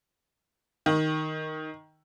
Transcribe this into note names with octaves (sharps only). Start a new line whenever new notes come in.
D#3